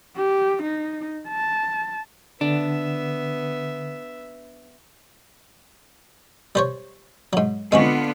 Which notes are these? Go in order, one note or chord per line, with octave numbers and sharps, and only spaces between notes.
G4
D#4
A5
D3 B3 D4 E5
G3 C5 C#5
G#2 F#3
D3 G#3 B3 C4 F4 F#4